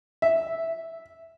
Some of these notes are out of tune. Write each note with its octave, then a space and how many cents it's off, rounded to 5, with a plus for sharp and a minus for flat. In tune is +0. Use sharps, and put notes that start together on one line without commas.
E5 -5